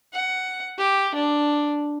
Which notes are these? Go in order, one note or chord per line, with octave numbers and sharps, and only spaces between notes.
F#5
G4
D4